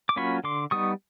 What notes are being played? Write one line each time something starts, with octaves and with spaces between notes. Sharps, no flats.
D6
F#3 A#3 C#4 F4 B5 C#6
D3 C6 D6
G3 B3 D#4 C#6 D#6